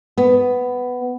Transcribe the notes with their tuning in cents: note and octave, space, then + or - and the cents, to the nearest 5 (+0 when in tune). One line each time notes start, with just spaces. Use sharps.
B3 +10